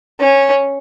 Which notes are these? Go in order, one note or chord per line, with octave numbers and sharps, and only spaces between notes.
C#4